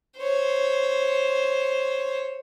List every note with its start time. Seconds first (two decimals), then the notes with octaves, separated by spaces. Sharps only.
0.18 C5 C#5